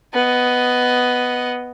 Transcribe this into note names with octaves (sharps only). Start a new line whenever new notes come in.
B3 D#5